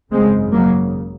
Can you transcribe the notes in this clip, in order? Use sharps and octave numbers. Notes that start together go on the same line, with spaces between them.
G#1 F#2 C#3 G#3 C4
F#3 A#3